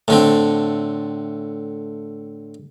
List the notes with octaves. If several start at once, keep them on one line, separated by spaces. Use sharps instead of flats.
A2 D3 C4